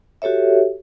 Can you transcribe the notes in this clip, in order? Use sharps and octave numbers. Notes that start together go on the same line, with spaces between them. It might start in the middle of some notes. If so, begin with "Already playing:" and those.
F#4 G4 A4 C#5 E5